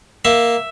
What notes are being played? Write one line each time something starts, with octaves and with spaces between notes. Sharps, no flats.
A#3 E5